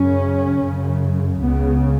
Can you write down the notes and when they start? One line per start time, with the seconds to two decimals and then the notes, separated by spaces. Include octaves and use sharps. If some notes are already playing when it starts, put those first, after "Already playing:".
Already playing: F#2 C#3 C#4
0.61 F#2 C#3
1.41 C#2 C#3 B3